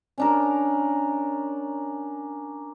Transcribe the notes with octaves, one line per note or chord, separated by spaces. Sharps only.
C#4 D4 A#4